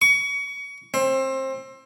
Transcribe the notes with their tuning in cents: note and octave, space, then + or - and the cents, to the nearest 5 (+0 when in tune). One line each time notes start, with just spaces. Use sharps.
C#6 +30
C4 +25